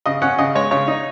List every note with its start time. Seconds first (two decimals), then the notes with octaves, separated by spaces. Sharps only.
0.06 C#3 D#5
0.22 C#4 F#5
0.38 C#3 D#5
0.55 G#3 C#5
0.71 C#3 C#5
0.88 D#4